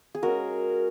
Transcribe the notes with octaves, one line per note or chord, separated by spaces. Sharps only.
G#4
G#3 C#4 F#4 A#4